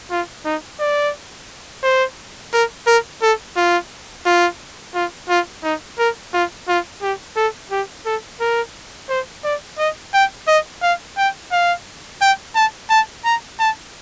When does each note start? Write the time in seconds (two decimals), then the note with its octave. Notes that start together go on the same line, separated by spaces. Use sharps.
0.11 F4
0.45 D#4
0.80 D5
1.83 C5
2.53 A#4
2.87 A#4
3.22 A4
3.57 F4
4.26 F4
4.95 F4
5.29 F4
5.64 D#4
5.99 A#4
6.34 F4
6.68 F4
7.02 G4
7.37 A4
7.71 G4
8.06 A4
8.41 A#4
9.10 C5
9.44 D5
9.79 D#5
10.14 G5
10.48 D#5
10.83 F5
11.18 G5
11.52 F5
12.22 G5
12.56 A5
12.90 A5
13.25 A#5
13.60 A5